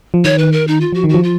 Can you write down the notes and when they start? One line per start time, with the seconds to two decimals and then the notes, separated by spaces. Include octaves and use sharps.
0.14 F3
0.24 D#3 C#5
0.38 B4
0.52 A#4
0.67 D#4
0.81 F4
0.92 F3 F#4
1.04 D#3
1.09 F#4
1.14 F3
1.23 F4